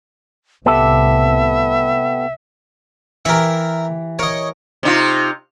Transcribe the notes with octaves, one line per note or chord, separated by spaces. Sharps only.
C2 A2 B3 G4 A4 E5
E3 G4 A#4 E5
A#4 C#5 D#5
C3 D#4 F4